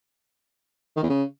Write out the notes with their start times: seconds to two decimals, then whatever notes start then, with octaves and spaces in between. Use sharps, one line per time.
0.96 D#3
1.03 E2
1.10 C#3